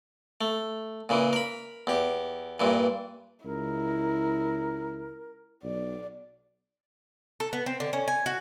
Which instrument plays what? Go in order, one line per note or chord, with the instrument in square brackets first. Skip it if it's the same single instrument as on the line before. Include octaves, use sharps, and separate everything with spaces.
[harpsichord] A3
A#2 C#3 E3
A#4 B5
E2 G4
G2 A#2 E3
[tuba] C#2 [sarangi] E4 [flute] A#4
[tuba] B1 [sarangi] D5
[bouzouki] A4
B3
C4
D3
C#4
G#5
F#4